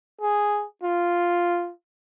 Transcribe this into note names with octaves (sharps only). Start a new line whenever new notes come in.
G#4
F4